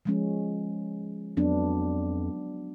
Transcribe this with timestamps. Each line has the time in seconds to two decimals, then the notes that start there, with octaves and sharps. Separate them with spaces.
0.05 F3 G#3 C#4
1.37 F2 F#3 B3 D4